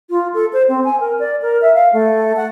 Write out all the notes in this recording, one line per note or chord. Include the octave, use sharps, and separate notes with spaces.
F4
A4
C5
C4
G#5
A#4
D5
A#4
E5
F5
A3
F#5